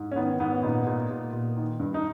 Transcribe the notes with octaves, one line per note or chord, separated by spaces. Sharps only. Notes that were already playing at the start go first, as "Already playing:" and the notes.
Already playing: G#2
C#4
D#3 B3
G#2 B3
C#4
A#2 B3 D#4
A#2
A#2
A#2
D#3
G2
D#4